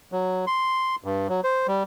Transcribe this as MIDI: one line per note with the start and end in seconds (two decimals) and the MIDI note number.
0.12 0.45 54
0.47 0.96 84
1.04 1.27 43
1.29 1.41 54
1.44 1.67 72
1.67 1.83 55